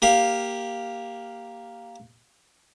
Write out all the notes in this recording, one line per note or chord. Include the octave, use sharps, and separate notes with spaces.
A#3 G4 F5